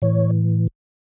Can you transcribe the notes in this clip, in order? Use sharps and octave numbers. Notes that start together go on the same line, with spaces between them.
A2 E3 C#5